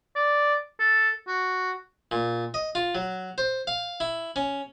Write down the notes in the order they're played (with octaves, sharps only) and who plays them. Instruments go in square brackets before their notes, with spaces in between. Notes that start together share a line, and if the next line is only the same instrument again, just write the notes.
[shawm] D5
A4
F#4
[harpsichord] A#2
D#5
F4
F#3
C5
F5
E4
C#4